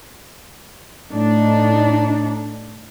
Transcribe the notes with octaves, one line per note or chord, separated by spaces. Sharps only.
A2 D4 D#4